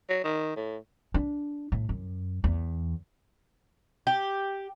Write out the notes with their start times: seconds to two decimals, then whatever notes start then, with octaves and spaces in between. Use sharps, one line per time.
0.09 F#3
0.24 D#3
0.56 A2
1.14 D4
1.72 A2
1.89 F#2
2.44 E2
4.07 G4